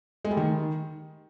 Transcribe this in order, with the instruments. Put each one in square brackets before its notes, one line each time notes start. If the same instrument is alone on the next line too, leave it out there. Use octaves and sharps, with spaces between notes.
[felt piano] G#3
G3
D#3